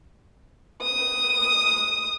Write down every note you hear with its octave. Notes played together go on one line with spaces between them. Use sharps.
D#6